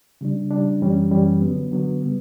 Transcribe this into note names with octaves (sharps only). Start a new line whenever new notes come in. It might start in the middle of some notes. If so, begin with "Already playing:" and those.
C#3 G3 D4
C#3 G3 D4
F#2 E3 G3 C#4
F#2 E3 G3 C#4
D3 F#3 B3
D3 F#3 B3
C#3 G3 B3